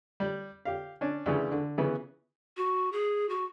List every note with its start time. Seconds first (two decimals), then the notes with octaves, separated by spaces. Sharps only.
0.20 G3
0.65 G4 F5
1.01 C#4 D4
1.26 D2 C#3 E3
1.51 D3
1.78 C#3 E3 B3
2.57 F#4
2.92 G#4
3.29 F#4